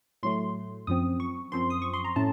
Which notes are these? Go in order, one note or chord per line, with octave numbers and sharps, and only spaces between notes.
A2 F#3 A3 C6
F#2 F3 C4 D#6
C#6
F#2 F3 C4 C6
D#6
C#6
C6
A#5
A2 A3 C#4 A5